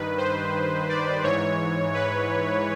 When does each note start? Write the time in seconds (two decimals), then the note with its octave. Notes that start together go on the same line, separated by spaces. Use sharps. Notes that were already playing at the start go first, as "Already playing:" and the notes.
Already playing: G2 D#3 B4
0.18 C5
0.89 D5
1.23 G#2 E3 C#5
1.94 B4